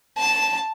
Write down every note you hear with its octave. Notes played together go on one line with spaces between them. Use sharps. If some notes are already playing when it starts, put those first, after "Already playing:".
A5